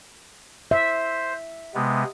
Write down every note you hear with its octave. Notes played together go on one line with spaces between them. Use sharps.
C5 E5
C3 G#3 B3